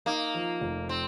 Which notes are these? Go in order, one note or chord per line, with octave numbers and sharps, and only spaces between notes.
A#3 D#4
F3
F1
C4